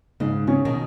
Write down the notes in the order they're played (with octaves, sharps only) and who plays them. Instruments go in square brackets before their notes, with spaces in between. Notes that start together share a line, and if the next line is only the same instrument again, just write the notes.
[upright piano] G#2 [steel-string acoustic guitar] C#3
[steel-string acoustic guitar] C#3 [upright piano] C#4
[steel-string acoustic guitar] B2 D#3